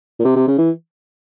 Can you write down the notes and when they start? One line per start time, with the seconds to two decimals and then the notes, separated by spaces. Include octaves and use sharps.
0.20 A#2
0.25 C3
0.36 C3
0.48 C#3
0.58 E3